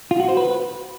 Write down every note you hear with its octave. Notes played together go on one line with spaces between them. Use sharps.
F4
F#4
C5
B4